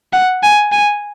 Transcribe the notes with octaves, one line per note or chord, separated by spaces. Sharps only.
F#5
G#5
G#5